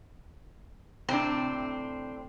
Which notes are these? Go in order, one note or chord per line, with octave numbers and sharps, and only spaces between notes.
A2 C3 C4 D4